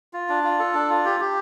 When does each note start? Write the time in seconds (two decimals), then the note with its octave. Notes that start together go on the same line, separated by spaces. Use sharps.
0.13 F4
0.29 D4
0.43 F4
0.59 A4
0.74 D4
0.90 F4
1.05 G4
1.20 G4